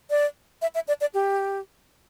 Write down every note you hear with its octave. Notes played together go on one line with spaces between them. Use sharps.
D5
E5
E5
D5
D5
G4